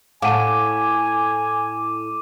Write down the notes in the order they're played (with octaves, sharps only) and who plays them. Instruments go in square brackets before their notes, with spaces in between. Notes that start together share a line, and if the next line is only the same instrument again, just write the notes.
[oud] A2 [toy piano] F5 F#5 A5 [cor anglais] G#5 [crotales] D6 D#7